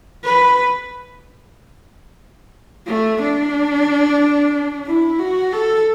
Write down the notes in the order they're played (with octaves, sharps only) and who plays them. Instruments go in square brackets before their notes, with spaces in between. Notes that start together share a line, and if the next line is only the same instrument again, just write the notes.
[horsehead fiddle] B4
A3
D4
E4
F#4
A4